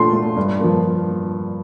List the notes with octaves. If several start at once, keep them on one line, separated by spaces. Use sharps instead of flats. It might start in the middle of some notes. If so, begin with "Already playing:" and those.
Already playing: A#2 A3 C6
A3
G2
F3 A#3